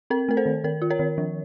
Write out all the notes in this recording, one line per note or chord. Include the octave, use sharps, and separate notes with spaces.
C4 A#4
A3 A#4
A4 C5
D#3
D#3 A#4
F4
A#4 C#5
D#3
F3